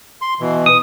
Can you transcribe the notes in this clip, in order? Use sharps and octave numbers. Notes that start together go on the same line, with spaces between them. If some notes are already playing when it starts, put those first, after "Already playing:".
C6
B2 E3
D#6